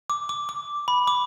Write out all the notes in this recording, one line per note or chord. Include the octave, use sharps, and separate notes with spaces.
D6
D6
D6
B5
D6